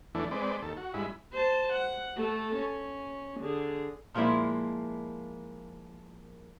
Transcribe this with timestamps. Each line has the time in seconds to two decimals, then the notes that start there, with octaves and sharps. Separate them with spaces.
0.15 E2 E3 A3 D4
0.31 G#3 C4 B4 D5
0.62 D#2 A4
0.77 F#4
0.94 G2 G#3 E4 B5
1.33 C5 A5
1.73 F#5
2.16 A3 A4
2.55 C#4
3.40 D3 G#4
4.14 A#2 F3 G#3 A#3 E4